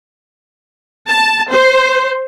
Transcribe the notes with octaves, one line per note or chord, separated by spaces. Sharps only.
A5
C5